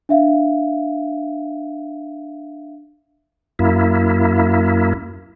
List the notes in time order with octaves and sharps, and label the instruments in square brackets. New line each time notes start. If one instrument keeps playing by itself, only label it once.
[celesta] D4 E5 F5
[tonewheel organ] F#2 A#3 E4